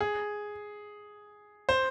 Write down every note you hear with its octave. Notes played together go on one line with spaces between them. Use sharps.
G#4
C5